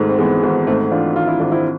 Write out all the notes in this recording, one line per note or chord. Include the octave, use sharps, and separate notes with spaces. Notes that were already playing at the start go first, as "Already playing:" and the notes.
Already playing: G#1 G#2 A3
C4
E3 G#3 B3
G#1
G#2 A3 C4
E3 D4 F4
G#1 F4
E4
G#1 D4
C4 E4